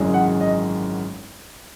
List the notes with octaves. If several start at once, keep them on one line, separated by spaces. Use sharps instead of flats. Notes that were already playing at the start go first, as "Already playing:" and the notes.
Already playing: G#1 F#2 C#3 E3 G#3
F#5
D#5